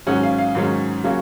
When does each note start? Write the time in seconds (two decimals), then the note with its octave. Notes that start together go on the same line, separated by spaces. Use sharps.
0.07 G#2 D#3 F#3 C#4 F#5
0.23 F5
0.39 F5
0.55 G#2 D#3 F#3 C#4
1.04 C#3 F#3 A#3 C#4